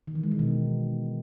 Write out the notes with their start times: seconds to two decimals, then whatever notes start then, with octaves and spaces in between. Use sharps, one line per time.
0.07 D#3
0.15 E3
0.23 G#3
0.31 D#3
0.39 B2